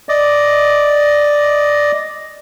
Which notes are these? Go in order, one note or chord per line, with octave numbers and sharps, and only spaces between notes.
D5 D#5